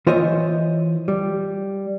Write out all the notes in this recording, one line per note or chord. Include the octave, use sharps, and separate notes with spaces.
E3 F4 C5 C#5 D#5 E5
G3